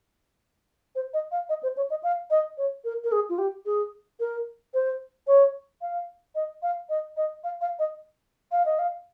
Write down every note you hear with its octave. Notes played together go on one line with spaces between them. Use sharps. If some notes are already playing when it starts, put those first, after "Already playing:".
C5
D#5
F5
D#5
C5
C#5
D#5
F5
D#5
C#5
A#4
A#4
G#4
F4
G4
G#4
A#4
C5
C#5
F5
D#5
F5
D#5
D#5
F5
F5
D#5
F5
D#5
F5